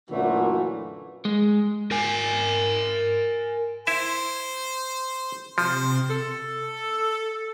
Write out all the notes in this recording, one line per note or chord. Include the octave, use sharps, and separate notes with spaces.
F#2 A#2 D3 E3 A3 F#4
G#3
A#4 G#5
E4 C5 E5
C3 F3 C4 C5
A4